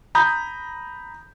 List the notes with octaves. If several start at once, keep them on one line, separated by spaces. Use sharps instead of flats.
A#5 B5 D#6 G6